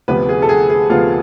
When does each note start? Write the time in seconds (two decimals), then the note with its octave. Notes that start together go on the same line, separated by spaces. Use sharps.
0.08 D2 C3 F3 B3 B4
0.29 G#4
0.42 A4
0.49 G#4
0.70 G#4
0.89 D2 C3 F3 B3 F4